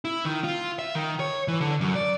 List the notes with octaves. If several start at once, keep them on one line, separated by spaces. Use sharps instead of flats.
E4
D#3
F4
E5
D#3
C#5
E3
D3
F#2
D5